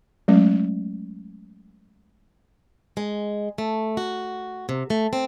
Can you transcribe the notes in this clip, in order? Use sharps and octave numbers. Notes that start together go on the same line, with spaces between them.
F#3 G#3 A3 C#4
G#3
A3
F#4
C3
A3
C4